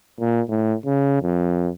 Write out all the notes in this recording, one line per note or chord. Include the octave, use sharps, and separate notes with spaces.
A#2
A2
C#3
F2